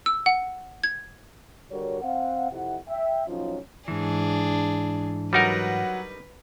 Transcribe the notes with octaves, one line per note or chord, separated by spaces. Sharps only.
E6
F#5
G#6
D3 G3 F#4 A#4 C#5
C4 F5 F#5
F2 C3 E4 F#5
E5 G5
A2 F3 F#3 C#4 D#4 F4
G#2 E3 D4 G#4
F#3 G3 D#4 A#4 B4 F#5